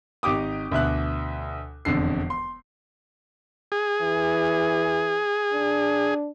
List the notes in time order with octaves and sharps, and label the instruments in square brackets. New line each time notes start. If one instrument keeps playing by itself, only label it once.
[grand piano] G#1 D#4 G4 D6 D#6
D2 B2 E5 F#6
E1 F2 D3 C7
C6
[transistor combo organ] G#4
[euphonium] E3
D4